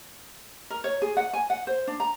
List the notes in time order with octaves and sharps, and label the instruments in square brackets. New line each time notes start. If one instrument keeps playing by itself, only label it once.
[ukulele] A#4
C#5
G#4
F#5
G#5
F#5
C5
D4
A#5